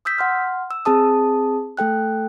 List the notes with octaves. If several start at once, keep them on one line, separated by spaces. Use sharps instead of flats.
D#6 E6 G6 B6
F#5 C6 F6
E6
C4 G#4 A5 D#6
A3 A4 G5 F#6